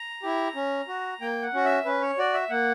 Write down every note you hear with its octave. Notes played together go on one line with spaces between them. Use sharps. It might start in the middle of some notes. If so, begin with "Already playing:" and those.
Already playing: A#5
E4 G4
C#4
F#4
A#3 G5
F#5
C#4 F#4
E5
C#4 B4
C#5
F#4 D5
E5
A#3 F#5